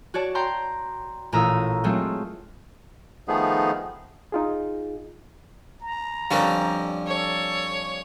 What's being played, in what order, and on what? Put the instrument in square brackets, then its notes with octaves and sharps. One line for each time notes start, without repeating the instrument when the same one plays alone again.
[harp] F#4 C#5 D5 A5
D5 G5 A#5 C6 G6
A1 A#2 A3 A#5 D#6 E6
F#3 G#3 A3 C4 F4
[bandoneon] D#3 F3 A3 B3 D#4 G#4
[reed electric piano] D#4 F4 G#4
[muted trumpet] A#5
[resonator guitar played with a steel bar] F2 D3 G3 [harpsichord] F3 C#4 A#4
[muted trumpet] A4 [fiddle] C#5